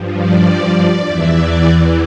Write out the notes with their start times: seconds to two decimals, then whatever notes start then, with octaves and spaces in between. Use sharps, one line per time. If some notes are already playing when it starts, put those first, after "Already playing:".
Already playing: G2 F3
0.14 D5
1.07 E2 E3 E5
1.37 D5